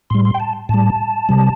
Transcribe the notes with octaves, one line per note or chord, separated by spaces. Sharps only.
A2 G3 C6
C6
G5
A5
A2 G3 A5
C3 G3